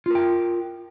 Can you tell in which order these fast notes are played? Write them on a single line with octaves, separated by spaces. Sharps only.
F4 A#4 G5